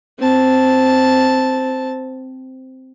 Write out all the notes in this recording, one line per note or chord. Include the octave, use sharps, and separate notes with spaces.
C4 A5